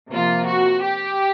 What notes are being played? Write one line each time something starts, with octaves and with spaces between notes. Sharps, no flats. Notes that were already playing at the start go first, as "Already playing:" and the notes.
C3 F3 A#3 F4
F#4
G4